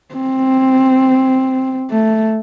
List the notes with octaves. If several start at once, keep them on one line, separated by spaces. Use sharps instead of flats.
C4
A3